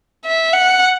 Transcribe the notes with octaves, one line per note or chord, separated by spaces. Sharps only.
E5
F#5